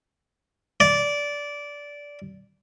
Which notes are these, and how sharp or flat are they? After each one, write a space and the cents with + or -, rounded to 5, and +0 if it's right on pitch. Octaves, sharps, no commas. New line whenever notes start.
D5 -15